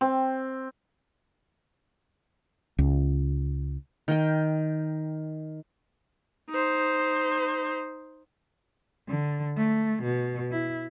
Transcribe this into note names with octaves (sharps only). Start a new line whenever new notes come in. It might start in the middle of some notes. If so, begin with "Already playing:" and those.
C4
C#2
D#3 G5
D#4 C5
D3
A3
B2
E4